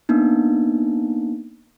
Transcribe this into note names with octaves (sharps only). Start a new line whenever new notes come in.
A#3 B3 D4 D#4